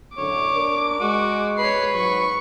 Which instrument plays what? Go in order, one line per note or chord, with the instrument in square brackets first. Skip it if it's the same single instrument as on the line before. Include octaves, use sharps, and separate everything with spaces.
[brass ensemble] F#2 A2 D3 [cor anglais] C#5 [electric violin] D6
[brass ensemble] D4 A#4
[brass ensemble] G#3 [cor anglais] F#4
[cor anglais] B4 [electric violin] C#5 C7
[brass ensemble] G#2 F#3 [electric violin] C#6